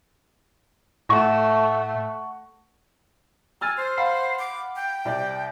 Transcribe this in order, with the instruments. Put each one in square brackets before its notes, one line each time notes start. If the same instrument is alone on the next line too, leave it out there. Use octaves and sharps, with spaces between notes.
[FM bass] A2 [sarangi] A3 [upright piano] F#5 C#6 A#6
[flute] G#5 [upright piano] E6 F6 A6
[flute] C5
[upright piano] F5 F#5 B5
[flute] D6
G5
[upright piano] C2 D5